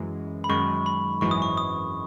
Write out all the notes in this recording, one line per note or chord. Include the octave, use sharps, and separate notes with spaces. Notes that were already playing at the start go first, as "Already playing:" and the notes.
Already playing: F#2 E3 G#3
B5
F#2 D#3 G#3 C#6
B5
G#1 F#2 E3 G#3 C#6
D#6
C#6
D#6